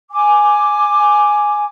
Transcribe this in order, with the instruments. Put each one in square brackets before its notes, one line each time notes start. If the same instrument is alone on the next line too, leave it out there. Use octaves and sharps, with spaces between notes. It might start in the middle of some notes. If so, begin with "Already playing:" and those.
[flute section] G#5 D6